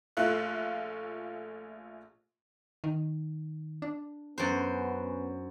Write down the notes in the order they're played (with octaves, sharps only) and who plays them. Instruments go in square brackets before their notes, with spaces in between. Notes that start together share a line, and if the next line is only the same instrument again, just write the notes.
[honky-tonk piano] A#1 A3 F4 E5 F#6
[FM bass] D#3
D4
[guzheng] F#2 C5 [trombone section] B3 C#4